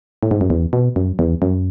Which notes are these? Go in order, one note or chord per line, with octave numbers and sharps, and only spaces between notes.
A2
G#2
F#2
E2
B2
F#2
E2
F#2